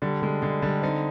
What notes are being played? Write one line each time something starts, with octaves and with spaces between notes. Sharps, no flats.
D3 G3
D3 G#3
D3 G#3
D3 G3
D3 C4 D#4